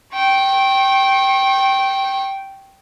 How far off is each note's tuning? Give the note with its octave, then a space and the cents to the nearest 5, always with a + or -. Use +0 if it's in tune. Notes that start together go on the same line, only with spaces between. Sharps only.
G5 -10 C#6 -35